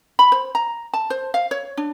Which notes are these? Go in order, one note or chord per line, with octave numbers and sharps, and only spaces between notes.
B5
C5
A#5
A5
C5
F5
C#5
D4